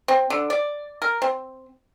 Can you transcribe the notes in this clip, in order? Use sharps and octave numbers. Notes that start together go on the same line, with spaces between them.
C4
D3
D5
A#4
C4